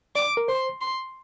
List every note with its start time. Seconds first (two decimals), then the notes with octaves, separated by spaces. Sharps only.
0.15 D5 D6
0.37 A#4
0.48 C5 C6
0.81 C6